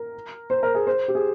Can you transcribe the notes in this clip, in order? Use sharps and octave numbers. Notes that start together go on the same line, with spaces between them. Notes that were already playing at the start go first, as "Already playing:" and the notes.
Already playing: A#4
C5
A#4
G#4
C5
G4
G#4